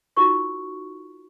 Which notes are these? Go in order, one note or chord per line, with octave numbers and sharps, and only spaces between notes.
D#4 F4 F#4 A#4 C#6